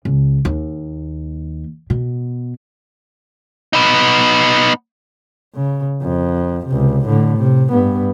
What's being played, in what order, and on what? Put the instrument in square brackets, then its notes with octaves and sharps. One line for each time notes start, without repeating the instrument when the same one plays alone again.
[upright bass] C#2
D#2
B2
[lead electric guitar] B3 D#4
[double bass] C#3
F2
C#2 C3
A2 D3
C3
G2 B3